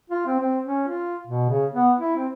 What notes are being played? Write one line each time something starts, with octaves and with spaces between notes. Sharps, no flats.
F4
C4
C4
C#4
F4
B2
C#3
B3
E4
C4